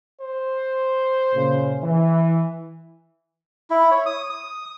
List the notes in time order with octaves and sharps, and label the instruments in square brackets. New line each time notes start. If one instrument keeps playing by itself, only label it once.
[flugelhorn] C5
[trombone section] A#2 C#3
E3
[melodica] E4
C#5
D#6
D#6